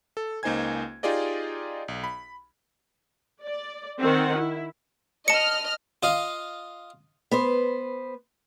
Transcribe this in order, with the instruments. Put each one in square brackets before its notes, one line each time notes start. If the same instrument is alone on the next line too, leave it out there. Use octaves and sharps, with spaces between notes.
[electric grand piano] A4
C#2 A#3 D#4 C5 G#5 G#6
D#4 F4 G4 G#4 D5 D#5
B1
B5
[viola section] D5
D#3 C4 F#5
E4
[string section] D#5 F6 [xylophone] A5 C#7
[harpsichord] F4 D#5 F5
[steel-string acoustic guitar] B3 B4 C5